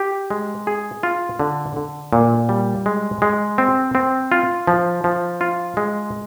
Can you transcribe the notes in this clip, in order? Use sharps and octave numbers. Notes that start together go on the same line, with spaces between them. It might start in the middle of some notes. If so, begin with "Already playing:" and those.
Already playing: G4
G#3
G#4
F4
D3
D3
A#2
G3
G#3
G#3
C4
C4
F4
F3
F3
F4
G#3